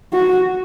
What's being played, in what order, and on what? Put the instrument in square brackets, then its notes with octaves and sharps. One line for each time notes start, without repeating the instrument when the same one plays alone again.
[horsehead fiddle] F#4